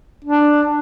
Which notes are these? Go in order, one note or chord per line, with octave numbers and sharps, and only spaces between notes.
D4